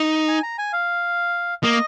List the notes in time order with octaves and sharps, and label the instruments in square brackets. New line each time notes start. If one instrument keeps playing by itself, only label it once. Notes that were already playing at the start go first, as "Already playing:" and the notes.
Already playing: [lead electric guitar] D#4
[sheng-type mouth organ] G#5
A#5
G#5
F5
[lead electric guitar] A#3 [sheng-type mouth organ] D#5